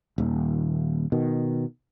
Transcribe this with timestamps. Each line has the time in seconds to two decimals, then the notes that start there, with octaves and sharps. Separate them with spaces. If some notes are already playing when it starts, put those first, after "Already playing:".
0.18 D#1 D#2
1.12 B2 D#3